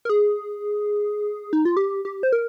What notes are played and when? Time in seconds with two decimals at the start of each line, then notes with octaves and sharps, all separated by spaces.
0.05 A#4
0.09 G#4
1.53 D#4
1.65 F4
1.77 G4
2.05 G4
2.23 C5
2.32 A#4